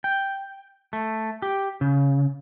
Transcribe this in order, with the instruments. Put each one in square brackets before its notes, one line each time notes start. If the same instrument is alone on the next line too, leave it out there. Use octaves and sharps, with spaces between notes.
[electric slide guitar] G5
A3
G4
C#3